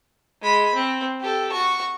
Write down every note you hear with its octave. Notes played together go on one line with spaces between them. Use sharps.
G#3 B5
C4
G4 A4
F#4 C#6